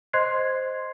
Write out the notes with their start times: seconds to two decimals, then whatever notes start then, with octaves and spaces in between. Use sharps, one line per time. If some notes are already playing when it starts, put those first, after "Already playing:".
0.13 C5 D#5 C6 F#6 G#6 C7